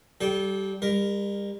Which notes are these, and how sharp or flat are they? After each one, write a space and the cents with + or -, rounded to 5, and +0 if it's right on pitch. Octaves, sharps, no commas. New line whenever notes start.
G3 -15 A4 -35 G5 +0
G3 +40 A#4 +0